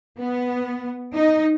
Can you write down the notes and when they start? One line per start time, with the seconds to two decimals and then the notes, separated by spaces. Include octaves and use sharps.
0.20 B3
1.15 D#4